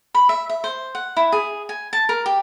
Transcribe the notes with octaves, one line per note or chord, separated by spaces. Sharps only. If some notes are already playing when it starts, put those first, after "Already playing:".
B5
E5
E5
C5
F#5
E4
G#4
G#5
A5
A#4
G4